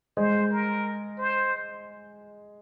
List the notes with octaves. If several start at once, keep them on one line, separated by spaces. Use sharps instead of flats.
G#3 C5
A#4
C5